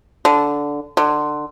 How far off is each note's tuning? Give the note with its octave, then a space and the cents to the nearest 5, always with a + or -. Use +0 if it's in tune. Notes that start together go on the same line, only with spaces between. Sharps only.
D3 -10
D3 +25